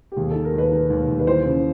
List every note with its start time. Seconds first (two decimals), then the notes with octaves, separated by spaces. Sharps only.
0.12 G4
0.17 D#2 G#4
0.31 D#3 A4
0.45 A#4
0.54 D#2 B4
0.72 D#3
0.90 D#2
1.08 D#2
1.19 B4
1.27 E3 C5
1.45 C#3